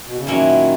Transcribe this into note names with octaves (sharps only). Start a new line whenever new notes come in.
B2
C#3
A#2 D#3 F#3 C#4 E4